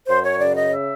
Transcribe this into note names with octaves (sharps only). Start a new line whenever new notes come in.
F#2 C5
C#5
C#3 D5
D#5
E5